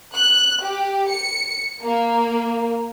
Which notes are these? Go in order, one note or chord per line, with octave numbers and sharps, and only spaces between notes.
F#6
G4
C#7
A#3